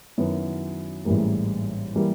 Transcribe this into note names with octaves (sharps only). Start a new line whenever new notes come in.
F#2 D#3 F#3 B3 E4
A1 G#2 E3 G3 A#3
E3 G3 A#3